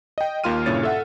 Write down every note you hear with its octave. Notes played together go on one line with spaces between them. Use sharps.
D#5 G5
D#2 A#3 F4 C6 F6 D#7
G2 A#2 C#3 E4 C#5 A6
A4 E5 F#5